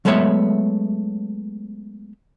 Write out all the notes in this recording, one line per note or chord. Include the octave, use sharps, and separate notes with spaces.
F#3 G#3 A3 B3 C#5 E5